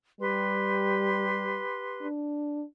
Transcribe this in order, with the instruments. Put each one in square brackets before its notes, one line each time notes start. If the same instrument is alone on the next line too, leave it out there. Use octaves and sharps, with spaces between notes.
[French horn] G3 [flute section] G4 B4 C6
[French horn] D4